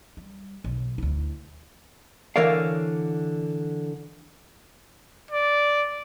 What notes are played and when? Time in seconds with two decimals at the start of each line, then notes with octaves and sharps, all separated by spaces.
0.17 G3
0.64 B1
0.98 D2 E4
2.36 D3 E3 A#4 C#5 D5 F5
5.31 D5